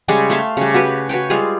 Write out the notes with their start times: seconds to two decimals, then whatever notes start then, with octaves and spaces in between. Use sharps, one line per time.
0.08 C#3 G3 G#3 G#5
0.30 A3 E5 F5 C6
0.57 C#3 G3
0.74 F#4 G4 B4
1.09 F#4 B4 C#5 G5
1.30 G3 G#3 F4 G#4